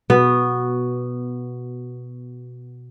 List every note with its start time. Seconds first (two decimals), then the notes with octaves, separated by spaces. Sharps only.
0.10 B2 B3 F#4